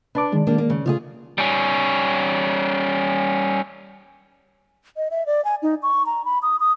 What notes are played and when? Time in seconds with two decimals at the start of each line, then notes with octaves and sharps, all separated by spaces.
0.15 D4 B4 A5 D6
0.33 D#3 G#3
0.47 A#3 D4 G4
0.58 A#3
0.70 C#3
0.86 C#3 A3 F4 G4 G#4
1.38 G3 C#4
4.97 D#5
5.11 E5
5.26 D5
5.45 G#5
5.62 D#4
5.83 C#6
6.06 A#5
6.25 B5
6.42 D#6
6.60 D#6